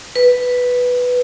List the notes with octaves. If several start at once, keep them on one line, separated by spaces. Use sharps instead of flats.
B4